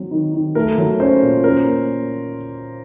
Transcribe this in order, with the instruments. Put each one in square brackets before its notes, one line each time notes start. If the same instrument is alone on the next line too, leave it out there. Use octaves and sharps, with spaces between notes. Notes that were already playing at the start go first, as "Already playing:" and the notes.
Already playing: [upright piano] F#3 C4
D#3
D#3
[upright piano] A3 [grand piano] A#4
[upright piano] F#3
[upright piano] C#4 [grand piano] C5
[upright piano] A#2
[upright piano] C#4 [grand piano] A#4
[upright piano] A#3